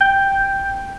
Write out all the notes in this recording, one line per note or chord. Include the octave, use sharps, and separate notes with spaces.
G5